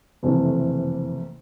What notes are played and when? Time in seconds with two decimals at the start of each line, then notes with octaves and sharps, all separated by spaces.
0.23 F#1 F2 C3 E3 A3